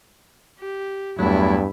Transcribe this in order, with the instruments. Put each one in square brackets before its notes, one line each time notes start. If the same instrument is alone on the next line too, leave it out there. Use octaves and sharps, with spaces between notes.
[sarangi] G4
[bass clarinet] E2 [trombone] G2 [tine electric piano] F#3 A3 [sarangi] E4